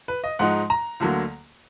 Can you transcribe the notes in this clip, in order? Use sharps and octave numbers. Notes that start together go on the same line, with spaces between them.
B4
D#5
G#2 F3 G#3 D#4 F#5
A#5
D2 D3 F#3 A#3